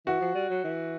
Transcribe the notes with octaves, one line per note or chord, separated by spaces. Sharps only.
E3 F#4
F3
G3
F#3
E3